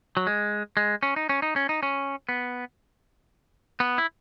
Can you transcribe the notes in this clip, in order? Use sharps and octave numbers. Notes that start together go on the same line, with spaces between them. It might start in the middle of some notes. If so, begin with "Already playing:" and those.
F#3
G#3
G#3
C#4
D#4
C#4
D#4
C#4
D#4
C#4
B3
B3
E4